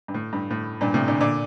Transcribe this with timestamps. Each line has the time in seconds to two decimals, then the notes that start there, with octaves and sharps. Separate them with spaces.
0.08 G2
0.14 A2
0.33 G2
0.50 A2
0.81 G2 A#2
0.94 A2 C3
1.08 A#2 D3
1.20 A#2 D3